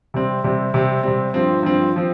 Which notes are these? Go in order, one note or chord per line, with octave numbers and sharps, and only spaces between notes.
C3 G3 C4
C3 G3 C4
C3 G3 C4
C3 G3 C4
G2 F3 C4
G2 F3 C4
F3 C4